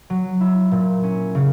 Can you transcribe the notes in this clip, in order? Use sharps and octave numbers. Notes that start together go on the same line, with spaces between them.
F#3
E4
A#2
C#4
C#3